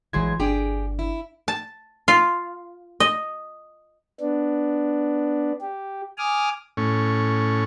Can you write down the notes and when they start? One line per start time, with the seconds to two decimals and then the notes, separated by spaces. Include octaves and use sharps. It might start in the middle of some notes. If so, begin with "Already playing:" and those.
0.13 A#1 E3 F#3 G#3 C6 G#6
0.40 G1 D4 G4 G#4 G5
0.99 E4
1.48 A5
2.08 F4
3.00 D#5
4.20 B3 D4
5.61 G4
6.18 G#5 D6 D#6 F6
6.77 A2 C#4